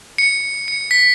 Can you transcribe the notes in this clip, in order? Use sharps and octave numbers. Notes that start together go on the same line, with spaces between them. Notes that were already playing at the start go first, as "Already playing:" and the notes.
C#7
C#7
B6